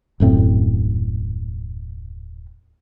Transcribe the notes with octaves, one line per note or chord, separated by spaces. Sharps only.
D#1 F#2 A2 C4